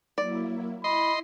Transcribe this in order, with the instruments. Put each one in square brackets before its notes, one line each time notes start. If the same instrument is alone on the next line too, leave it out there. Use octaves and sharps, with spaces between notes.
[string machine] F#3 A#3 E4 [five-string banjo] D5
[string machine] E4 [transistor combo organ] D#5 C6 [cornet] B5